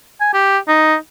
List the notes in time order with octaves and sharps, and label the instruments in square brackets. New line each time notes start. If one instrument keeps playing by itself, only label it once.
[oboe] G#5
G4
D#4